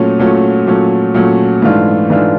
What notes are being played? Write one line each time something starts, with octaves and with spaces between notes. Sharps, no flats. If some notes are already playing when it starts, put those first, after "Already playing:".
Already playing: A#2 F#3 A3 C#4
A#2 F#3 A3 C#4
A#2 F#3 A3 C#4
A#2 F#3 A3 C#4
G#2 E3 A3 D4 F4
G#2 E3 A3 D4 F4